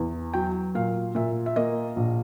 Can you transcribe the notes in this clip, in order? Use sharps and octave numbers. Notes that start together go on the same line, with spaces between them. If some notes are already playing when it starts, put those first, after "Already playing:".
Already playing: E2
F#3 G5
A#2 F5
A#2 E5
E5
A#3 D#5
A#1